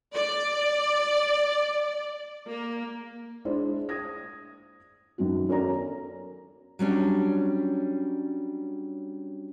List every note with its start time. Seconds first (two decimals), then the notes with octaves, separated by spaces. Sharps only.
0.14 D5
2.48 A#3
3.45 G#3 D4 E4 C5 D5
3.89 D#6 G#6 A#6
5.18 F#2 D#3 B3 F#4
5.49 C#4 F#4 A4 A#4 D5 A#5
6.79 F#3 G3 C#4 D4